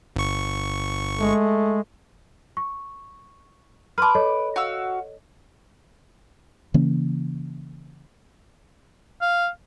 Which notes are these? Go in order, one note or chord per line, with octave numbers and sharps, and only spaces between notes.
G1 C#6
G#3 A3
C#6
B4 A5 C6 D6 F6
A4 C#5 D#5
F#4 F5 E6
C#3 E3 A#3 C#4
F5